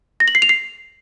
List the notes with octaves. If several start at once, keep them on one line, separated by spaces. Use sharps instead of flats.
A#6
F#7
C7
F7
C7